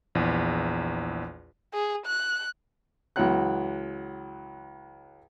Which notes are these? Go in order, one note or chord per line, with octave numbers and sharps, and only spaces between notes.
A#1 E2
G#4
F#6
C#2 E3 F#3 F#5 F#6